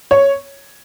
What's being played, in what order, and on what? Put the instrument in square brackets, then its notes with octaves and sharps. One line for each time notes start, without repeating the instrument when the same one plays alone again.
[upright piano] C#5